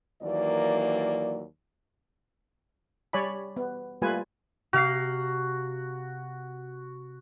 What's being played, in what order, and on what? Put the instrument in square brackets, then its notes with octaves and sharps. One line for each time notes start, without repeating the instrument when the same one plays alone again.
[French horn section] D#2 E3 F#3 A#3 D5
[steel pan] G3 C#5 D5 G#5 B5
B3
G3 A3 A#3 F4 B4 G#5
[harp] C3 F5 C7 [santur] F#4